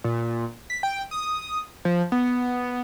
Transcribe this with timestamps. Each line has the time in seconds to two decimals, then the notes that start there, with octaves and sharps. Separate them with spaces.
0.04 A#2
0.70 B6
0.83 G5
1.11 D#6
1.85 F3
2.12 B3